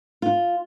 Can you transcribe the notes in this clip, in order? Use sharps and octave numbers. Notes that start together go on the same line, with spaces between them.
F4